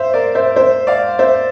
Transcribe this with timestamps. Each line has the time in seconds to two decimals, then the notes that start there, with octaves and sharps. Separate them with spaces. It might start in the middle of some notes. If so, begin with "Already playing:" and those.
Already playing: C5 E5 F5
0.14 A#4 D5
0.35 C5 E5
0.56 C5 E5
0.87 D5 F5
1.19 C5 E5